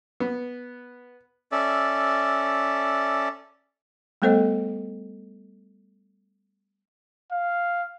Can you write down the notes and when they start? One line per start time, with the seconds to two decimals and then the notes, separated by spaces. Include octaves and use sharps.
0.20 B3
1.52 C#4 A4 D5 E5
4.22 G3 A3 B3 A4 C5 D#5
7.32 F5